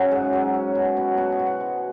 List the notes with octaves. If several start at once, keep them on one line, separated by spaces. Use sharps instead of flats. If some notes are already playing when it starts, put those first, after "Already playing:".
Already playing: C#3 F#3 F#4 E5
G#2 G#4
F#3
C#4
B2
B2
B2 F#4
G#4
B2
F#4
G#3